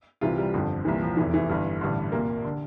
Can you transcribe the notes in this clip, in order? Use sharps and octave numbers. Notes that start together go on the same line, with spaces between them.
C2 C3 E3 F4
G3
G1 F2 D3 F3
C2 A#2 E3
F3
F1 E2 E3
E3
G1 G2 D3
A1 G2 D3
C2 A#2 A#3
D3